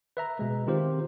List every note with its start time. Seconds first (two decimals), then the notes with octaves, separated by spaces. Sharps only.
0.17 B4 E5 A#5
0.39 B2 G#3
0.67 D#3 C4 F4 G4 C5